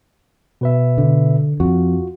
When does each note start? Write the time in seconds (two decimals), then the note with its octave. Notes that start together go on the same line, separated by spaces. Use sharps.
0.61 B2 B4 E5
0.98 D3
1.60 F2 F4 F#4